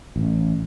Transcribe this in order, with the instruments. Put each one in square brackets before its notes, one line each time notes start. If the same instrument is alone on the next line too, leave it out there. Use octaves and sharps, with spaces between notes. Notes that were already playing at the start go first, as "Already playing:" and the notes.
[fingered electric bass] A1